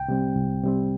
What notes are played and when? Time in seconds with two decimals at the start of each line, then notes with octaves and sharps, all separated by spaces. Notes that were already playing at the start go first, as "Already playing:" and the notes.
Already playing: C2 G5
0.08 C3 G3 C4
0.36 C2
0.63 C3 G3 C4